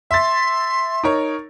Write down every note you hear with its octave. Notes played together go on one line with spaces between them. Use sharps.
E5 C6 A6
D#4 A#4 C#5